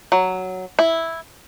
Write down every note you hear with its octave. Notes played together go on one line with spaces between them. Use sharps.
F#3
E4